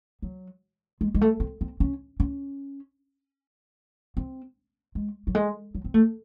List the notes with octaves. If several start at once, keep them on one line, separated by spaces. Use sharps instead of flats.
F#3
G#3
G#3
A3
C4
C4
C#4
C#4
C4
G#3
F#3
G#3
F#3
C4
A3